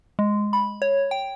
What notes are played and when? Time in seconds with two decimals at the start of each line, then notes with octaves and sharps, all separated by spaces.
0.19 G#3
0.53 B5
0.82 C#5
1.11 G5